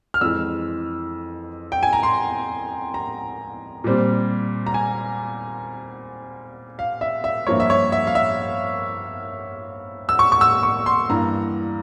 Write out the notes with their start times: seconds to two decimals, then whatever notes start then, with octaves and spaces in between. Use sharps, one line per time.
0.14 F6
0.21 F2 E3 G#3 E6
1.72 G5
1.83 G#5
1.93 A#5
2.03 C6
2.94 A#5
3.84 A#2 G3 C4
4.66 A#5
4.74 G#5
6.79 F5
7.01 E5
7.24 E5
7.47 G2 F3 A#3 C#5
7.60 E5
7.70 C#5
7.92 E5
8.07 F5
8.15 E5
10.09 E6
10.19 C#6
10.32 C#6
10.41 E6
10.63 C#6
10.86 C6
11.09 G2 E3 A#3 A#5